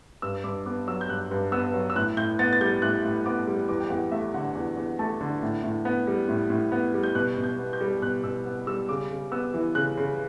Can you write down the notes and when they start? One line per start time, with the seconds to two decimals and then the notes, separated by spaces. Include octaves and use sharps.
0.22 G2 E6
0.44 G2 D6
0.66 B3 D6
0.87 F#3 E6
1.01 G6
1.09 G2 F#6
1.31 G2
1.52 B3 E6
1.74 F#3
1.90 E6
1.96 A2 F#6
2.17 A2 G6
2.39 B3 A6
2.53 A6
2.61 G3 G6
2.82 A2 F#6
3.04 A2
3.26 B3 D6
3.47 G3
3.69 E2 D6
3.80 G5
3.90 E2 F#5
4.12 A3 E5
4.34 D3 F#5
4.55 E2
4.77 E2
4.99 A3 A5
5.21 D3
5.43 A2
5.63 A2
5.85 B3
6.07 G3
6.29 A2
6.50 A2
6.72 B3
6.94 G3
7.03 G6
7.15 B2 F#6
7.38 B2
7.44 G6
7.59 B3
7.73 G6
7.81 G3
8.02 B2 F#6
8.24 B2 E6
8.45 B3
8.67 G3 E6
8.89 C#3 D6
9.10 C#3
9.31 B3 E6
9.54 E3
9.75 C#3 F#6
9.97 C#3